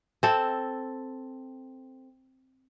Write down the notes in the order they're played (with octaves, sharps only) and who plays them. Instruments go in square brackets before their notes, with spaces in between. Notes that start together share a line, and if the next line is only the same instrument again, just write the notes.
[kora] C4 A4